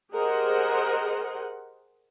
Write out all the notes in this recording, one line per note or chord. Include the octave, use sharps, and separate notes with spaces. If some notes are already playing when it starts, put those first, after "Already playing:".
G4 G#4 A#4 C5 D#5 F#5